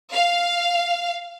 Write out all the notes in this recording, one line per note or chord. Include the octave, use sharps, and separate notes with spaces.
F5